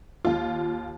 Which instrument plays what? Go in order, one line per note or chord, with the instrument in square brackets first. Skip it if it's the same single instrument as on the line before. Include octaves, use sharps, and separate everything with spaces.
[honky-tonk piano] D#2 F4